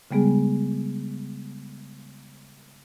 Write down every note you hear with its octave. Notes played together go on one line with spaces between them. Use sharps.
C#3 G3 G#3 B3 G#4